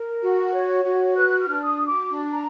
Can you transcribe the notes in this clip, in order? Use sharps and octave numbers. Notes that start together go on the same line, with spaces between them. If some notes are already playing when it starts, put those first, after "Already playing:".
Already playing: A#4
F#4
C#5
F#4
B4 F#6
F6
D4
D#6
F#4
D6
D4
A#5